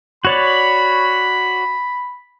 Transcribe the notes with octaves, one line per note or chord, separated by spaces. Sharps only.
F#4 C#5 D5 B5